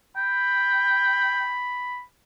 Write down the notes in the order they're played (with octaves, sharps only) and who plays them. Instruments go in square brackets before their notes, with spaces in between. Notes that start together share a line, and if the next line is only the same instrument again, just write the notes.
[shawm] G5 [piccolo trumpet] B5